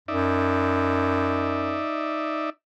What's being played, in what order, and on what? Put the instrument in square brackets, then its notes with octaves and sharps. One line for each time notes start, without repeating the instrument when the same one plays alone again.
[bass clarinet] F#2 [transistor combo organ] D#4 D5 E5